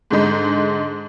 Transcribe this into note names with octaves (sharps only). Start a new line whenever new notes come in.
G#2 D3 G#3